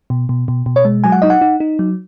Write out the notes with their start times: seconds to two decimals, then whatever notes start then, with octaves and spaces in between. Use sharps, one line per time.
0.10 B2
0.29 B2
0.48 B2
0.66 B2
0.76 C#5
0.85 G#3
1.04 F#3 G#5
1.12 F#5
1.22 D#4 D#5
1.30 F#5
1.41 D#4
1.60 D#4
1.79 F#3